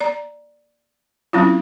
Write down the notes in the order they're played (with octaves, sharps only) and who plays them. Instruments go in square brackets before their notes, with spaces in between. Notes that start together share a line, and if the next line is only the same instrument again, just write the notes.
[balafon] D5 A#5
F#3 C4 C#4 E4 F4